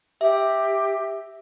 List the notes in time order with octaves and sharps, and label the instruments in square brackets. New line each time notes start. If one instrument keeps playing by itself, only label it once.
[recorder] G4 [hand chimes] E5